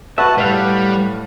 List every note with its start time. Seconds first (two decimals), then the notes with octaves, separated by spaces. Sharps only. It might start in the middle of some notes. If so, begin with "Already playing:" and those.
0.18 F#4 B4 E5 F#5 A5
0.38 A2 G3 B4 F5